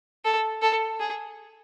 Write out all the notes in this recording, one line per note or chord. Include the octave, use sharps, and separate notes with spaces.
A4
A4
G#4